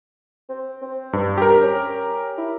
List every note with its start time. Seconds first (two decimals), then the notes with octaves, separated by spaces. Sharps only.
0.49 C4
0.82 C4
1.13 G2
1.38 G4 A#4
1.62 C#4
2.38 E4